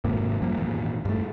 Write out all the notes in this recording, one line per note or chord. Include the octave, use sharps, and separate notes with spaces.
G#1 G#2 C3 A#3
F#2 F3 G3 A#3
G#1 E2 A#2
G2 A3